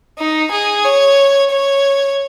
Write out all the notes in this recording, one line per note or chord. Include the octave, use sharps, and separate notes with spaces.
D#4
G#4
C#5
C#5